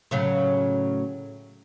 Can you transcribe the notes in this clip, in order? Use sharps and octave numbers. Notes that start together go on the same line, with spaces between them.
A2 C#3 F#3